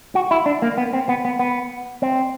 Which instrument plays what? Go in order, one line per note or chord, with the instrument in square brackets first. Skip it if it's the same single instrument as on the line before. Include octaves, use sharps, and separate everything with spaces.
[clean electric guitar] F#4
E4
D4
A#3
B3
C4
B3
B3
B3
C4